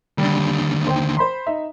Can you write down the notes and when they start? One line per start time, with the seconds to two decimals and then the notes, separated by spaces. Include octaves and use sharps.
0.18 D#2 D3 G3
0.87 C5 G5
1.17 C5 B5 C6
1.46 D#4 E5